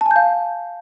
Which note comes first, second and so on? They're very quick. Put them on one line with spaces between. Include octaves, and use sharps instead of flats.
A5 G#5 G6 F5